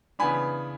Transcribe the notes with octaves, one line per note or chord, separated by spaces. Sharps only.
C#3 E3 B3 D4 G#5 B5